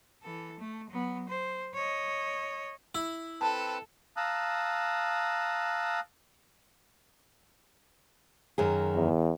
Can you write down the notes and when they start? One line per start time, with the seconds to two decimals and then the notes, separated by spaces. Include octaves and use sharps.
0.23 E3 A4
0.59 A3
0.89 F#3 B3
1.29 C5
1.74 C#5 D#5
2.95 E4
3.41 C4 A4 B4 A5
4.17 F5 A5 A#5 D#6 E6 F#6
8.58 F#2 D#3 G#4
8.96 E2